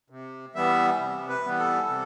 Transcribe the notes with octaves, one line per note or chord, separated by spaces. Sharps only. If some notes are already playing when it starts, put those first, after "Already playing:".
C3
E3 G3 B3 E5
C3
B4
E3 G3 B3
A4
C3